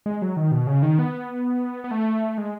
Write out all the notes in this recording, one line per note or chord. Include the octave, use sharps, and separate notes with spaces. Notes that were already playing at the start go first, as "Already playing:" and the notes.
G#3
F#3
D#3
B2
C#3
D#3
B3
B3
A3
G#3